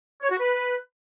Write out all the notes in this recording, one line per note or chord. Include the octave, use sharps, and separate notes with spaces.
C#5
F#4
B4